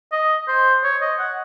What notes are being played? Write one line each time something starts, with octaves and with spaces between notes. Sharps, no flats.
D#5
C5
C#5
D#5
F#5